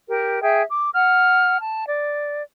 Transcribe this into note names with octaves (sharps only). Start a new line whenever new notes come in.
G4 A#4
G#4 E5 G5
D6
F#5 F6
A5
D5